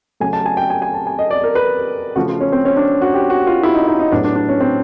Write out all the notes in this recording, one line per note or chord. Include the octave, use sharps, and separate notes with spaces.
C#3 F#3 A3 G#5
A5
G#5
G5
G#5
G#5
A5
G#5
D#5
D5
A#4
B4
C#3 F3 A3 F#4
F4
C#4
C4
C#4
D4
F#4
G4
F#4
F4
E4
D#4
D#4
D#4
A2 F#3 B3 D4
D4
D4
C#4
C4